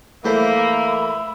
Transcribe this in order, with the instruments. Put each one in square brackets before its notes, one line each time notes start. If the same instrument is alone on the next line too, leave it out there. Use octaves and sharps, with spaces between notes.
[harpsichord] E3 A3 C5 [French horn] A#3 [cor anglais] E5 [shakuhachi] B5